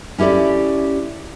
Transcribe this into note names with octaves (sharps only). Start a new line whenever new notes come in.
C#4 E4 G4 A4 D5